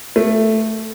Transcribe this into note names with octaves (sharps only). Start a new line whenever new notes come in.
A3